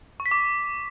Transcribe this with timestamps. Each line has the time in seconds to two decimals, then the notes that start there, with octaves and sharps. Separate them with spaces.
0.20 C#6
0.26 B6
0.31 D6